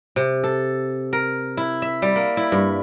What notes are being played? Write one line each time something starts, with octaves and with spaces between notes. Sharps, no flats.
C3
A4
A#4
E4
E5
G3
A#3
E4
G2